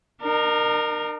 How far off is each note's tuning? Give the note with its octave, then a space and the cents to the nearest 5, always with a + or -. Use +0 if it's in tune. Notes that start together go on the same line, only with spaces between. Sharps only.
D#4 -45 A#4 +0